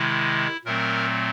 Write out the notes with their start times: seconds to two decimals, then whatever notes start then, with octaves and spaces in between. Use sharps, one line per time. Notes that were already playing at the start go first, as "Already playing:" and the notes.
Already playing: C3 D#3 G#3 E4
0.65 A#2 F#3 A3 C4 A#4